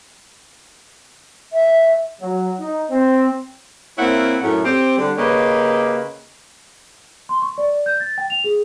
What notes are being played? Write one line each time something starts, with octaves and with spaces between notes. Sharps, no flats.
E5
F#3
D#4
C4
A#3 C4 C#4 E4 E5 F#5
F#2 A2 C#4
C4 G4 C5
D3 G3
C#3 A#3 C#4 G4 B4 D#5
C6
C#6
D5
G6
A6
G5
F7
G#4